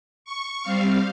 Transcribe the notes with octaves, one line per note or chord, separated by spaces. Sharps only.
C#6
G3 C4 F5